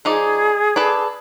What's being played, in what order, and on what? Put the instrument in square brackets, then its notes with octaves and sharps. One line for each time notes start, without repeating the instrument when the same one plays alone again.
[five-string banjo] F3 D#4 D5 [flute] G#4
[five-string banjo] A4 B4 D5